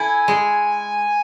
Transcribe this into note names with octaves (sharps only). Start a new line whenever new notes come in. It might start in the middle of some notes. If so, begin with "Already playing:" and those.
Already playing: E4 A4 G#5
G#3